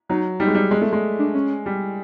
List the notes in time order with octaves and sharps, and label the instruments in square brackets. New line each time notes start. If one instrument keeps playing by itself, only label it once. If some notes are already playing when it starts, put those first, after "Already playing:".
[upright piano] F#3 [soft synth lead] D#4
[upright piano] G3 [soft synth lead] D#4
[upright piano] G#3
G3
G#3
A3
G#3
[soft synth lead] D4
C#4
[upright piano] G3